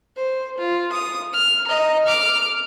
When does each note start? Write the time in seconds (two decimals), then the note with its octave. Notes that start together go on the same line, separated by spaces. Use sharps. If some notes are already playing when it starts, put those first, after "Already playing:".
0.16 C5
0.58 F4
0.92 D#6
1.33 F6
1.67 D#5 A#5
2.05 D6 F6